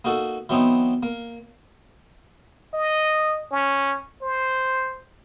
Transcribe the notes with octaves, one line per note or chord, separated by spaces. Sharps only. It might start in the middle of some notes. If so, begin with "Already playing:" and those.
A#3 D#4 F#4 A4
E3 F#3 B3 C4 D#4
A#3
D#5
C#4
C5